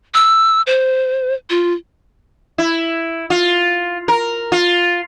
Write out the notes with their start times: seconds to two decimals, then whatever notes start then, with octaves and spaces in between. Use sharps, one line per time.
0.14 E6
0.67 C5
1.50 F4
2.58 E4
3.30 F4
4.08 A#4
4.52 F4